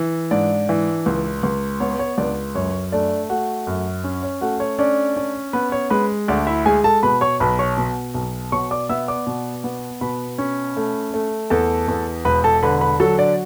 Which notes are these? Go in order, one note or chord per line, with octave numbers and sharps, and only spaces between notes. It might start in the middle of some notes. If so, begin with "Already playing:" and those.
Already playing: E3
G#2 D4 D5
E3
C#2
C#2
B3 C#5
C#5
C#2 D4 D5
F#2 C#5
A3 D4 D5
A3 F#4 F#5
F#2
C#4
C#5
A3 F#4 F#5
C#5
C#4 D4 D5
C#4
B3 B4
C#5
G#3 B4
D2 D4 D5
E4 E5
G#3 G#4 G#5
A4 A5
B2 B4 B5
C#5 C#6
B1 B4 B5
C#5 C#6
B2
B1
B2 C#5 C#6
D5 D6
B3 E5 E6
D5 D6
B2
B3
B2 B4 B5
C#4
A3
A3
E2 A4 A5
E2
E1 B4 B5
A4 A5
D3 B4 B5
B4 B5
F#3 A4 A5
D4 D5